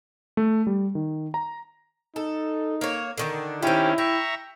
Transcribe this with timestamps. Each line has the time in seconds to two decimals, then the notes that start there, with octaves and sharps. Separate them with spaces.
0.37 A3
0.67 G3
0.95 D#3
1.34 A#5
2.16 D#4 A4
2.81 A#3 C#5
3.18 D3 D#3 D4
3.63 D#3 C4 C#4 E4 G4
3.98 E5 G5 A#5 C#6